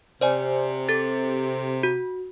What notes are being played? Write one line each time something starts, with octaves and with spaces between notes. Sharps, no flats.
C3 C5 D5 G#5
A4 A6
F#4